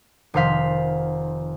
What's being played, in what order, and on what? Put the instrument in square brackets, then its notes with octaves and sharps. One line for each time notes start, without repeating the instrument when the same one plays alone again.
[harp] F1 D#3 C5 F5 B6